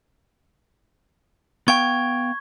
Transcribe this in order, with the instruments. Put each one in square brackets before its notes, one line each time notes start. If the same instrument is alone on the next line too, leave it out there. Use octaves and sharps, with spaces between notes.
[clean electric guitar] B3 F5 G5 [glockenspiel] C#6 G#6